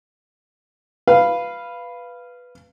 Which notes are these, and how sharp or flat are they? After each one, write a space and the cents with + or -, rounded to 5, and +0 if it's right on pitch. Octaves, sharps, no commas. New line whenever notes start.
B4 +0 F5 -10